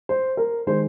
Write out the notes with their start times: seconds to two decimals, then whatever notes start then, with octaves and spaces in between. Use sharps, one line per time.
0.09 C5
0.37 A#4
0.67 D#3 G#3 C5